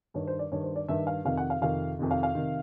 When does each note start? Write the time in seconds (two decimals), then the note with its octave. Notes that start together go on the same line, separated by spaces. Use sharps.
0.14 G2 D#3 C#5
0.27 C5
0.39 D5
0.52 G2 D#3 C#5
0.64 C5
0.76 D5
0.88 G2 D#3 E5
1.07 F5
1.25 F2 C3 D#3 F5
1.37 F#5
1.50 F5
1.62 F2 C3 D#3 F5
1.99 F2 C3 D#3
2.11 F5
2.23 F5
2.35 C3 D#3